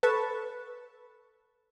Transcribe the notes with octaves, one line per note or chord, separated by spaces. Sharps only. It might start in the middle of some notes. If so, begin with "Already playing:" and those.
A4 B4 A5 C#6